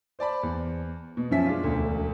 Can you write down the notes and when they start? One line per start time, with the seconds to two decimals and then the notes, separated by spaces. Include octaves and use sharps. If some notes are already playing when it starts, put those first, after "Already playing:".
0.19 C5 D5 A5 B5
0.43 E2
1.17 B2
1.31 F#2 F3 C#4 E5 B6
1.46 G#3 D4 F4
1.64 E1 D2